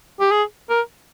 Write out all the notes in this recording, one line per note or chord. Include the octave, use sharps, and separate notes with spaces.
G4
G#4
A#4